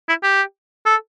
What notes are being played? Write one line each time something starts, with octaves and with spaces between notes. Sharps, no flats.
E4
G4
A4